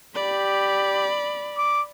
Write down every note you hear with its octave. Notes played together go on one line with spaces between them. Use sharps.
G4 D5 B5
D6